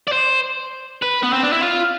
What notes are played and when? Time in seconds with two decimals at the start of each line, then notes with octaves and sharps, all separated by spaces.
0.07 D5
0.12 C5
1.02 B4
1.23 B3
1.33 C4
1.43 D4
1.53 E4
1.62 F4